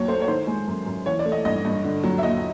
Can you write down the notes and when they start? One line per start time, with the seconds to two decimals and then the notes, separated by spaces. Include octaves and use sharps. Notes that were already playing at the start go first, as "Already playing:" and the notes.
Already playing: D#2 F#3 C#5
0.08 A3 C5
0.22 C#5
0.28 D#3 C5
0.47 G#3
0.67 F#2
0.86 F#2
1.06 E3 C#5
1.19 D5
1.26 A3
1.32 D#5
1.45 G2 D#5
1.65 G2
1.84 D3
2.04 F#3
2.18 E5
2.23 D#2 D#5